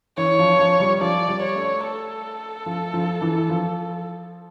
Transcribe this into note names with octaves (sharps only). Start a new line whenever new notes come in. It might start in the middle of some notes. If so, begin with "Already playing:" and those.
E3 C#5
F3
F3
G3
F3 D5
G3
C#5
A3
A4
F3
F3
E3
F3